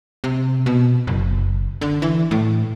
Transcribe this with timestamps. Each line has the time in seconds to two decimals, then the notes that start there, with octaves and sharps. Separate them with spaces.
0.24 C3
0.66 B2
1.07 F#1
1.81 D3
2.02 E3
2.31 A2